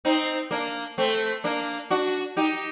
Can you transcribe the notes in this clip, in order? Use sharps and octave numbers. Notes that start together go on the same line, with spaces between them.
C4 D#4
A#3 D4
A3 C4
A#3 D4
D4 F#4
D#4 G4